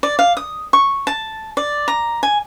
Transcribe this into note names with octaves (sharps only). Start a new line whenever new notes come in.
D5
F5
D#6
C#6
A5
D5
A#5
G#5